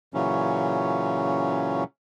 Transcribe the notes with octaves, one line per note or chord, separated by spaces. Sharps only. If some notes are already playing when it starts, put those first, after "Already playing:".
A#2 C#3 E3 F#3 C#4